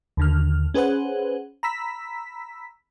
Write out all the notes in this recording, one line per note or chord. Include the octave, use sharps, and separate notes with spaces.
D#2 D3 F6
C#4 G#4 B4 C5 F#5
A#5 B5 E6 B6